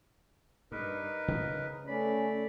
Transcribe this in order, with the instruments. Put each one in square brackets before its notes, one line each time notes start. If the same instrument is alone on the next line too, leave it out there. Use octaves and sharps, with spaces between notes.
[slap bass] G2 [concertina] D#4 A#4 B4
[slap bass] C#3 B3
[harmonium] A3 D5 [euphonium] C#4 [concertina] B5